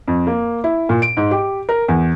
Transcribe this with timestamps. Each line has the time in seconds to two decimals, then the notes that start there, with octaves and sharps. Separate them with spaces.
0.08 F2
0.27 A#3
0.64 E4
0.89 A#2
1.02 D7
1.17 G#2
1.31 G4
1.69 A#4
1.88 E2